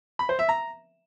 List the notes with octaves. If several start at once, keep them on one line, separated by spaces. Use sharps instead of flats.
B5
C5
E5
A#5